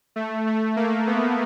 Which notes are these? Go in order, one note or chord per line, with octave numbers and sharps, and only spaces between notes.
A3
A3
A#3
B3